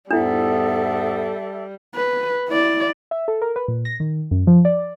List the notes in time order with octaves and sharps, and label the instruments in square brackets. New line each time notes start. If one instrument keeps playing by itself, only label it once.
[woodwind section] E2 G#2 B3 [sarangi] G3 [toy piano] D4 E4 [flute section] A4 E5
[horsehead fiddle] B4
E4 D5
[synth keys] E5
A4
A#4
B4
A#2
A#6
D#3
F#2
F3
D5